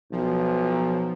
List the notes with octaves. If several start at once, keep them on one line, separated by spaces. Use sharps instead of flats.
B1 F3